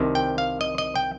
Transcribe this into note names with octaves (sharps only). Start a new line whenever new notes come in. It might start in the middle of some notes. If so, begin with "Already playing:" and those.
Already playing: C2 C3 D#3
G5
F5
D#5
D#5
G5